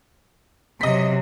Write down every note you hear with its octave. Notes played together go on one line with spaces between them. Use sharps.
C3 F#3 D#5 B6